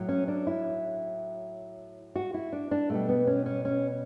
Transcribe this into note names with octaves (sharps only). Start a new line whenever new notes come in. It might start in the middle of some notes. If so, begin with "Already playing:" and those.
Already playing: A2 F#3
C#4
D4
E4
F#4
E4
D4
D4
B2 G3 A3
B3
C#4
C#4
C#4